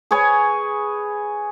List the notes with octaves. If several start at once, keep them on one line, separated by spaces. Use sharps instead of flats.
G#4 B4 C#5 G#5